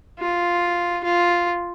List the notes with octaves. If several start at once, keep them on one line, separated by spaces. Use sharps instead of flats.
F4
F4